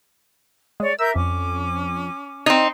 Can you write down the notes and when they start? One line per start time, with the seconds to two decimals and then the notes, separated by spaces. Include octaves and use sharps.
0.80 G#3 C#5 D5
0.99 A#4 E5 E6 G6
1.16 F2 C#4 D6
2.46 C4 D#4